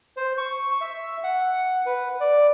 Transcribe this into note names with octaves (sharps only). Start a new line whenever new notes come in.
C5
C#6
E5
F#5
B4
D5